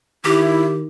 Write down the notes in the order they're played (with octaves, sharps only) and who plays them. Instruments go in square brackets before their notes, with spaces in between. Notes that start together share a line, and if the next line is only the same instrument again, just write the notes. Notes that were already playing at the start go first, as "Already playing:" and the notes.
[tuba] D#3 [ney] E4 [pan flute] G4